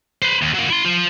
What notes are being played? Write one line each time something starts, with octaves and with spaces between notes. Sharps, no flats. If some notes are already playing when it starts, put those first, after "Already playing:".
B4 C5
D#2
F#3 A#3
E4 C6
F4 C5